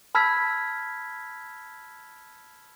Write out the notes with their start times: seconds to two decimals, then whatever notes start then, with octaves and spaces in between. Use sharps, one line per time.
0.15 A5 B5 E6 F6 G#6 B6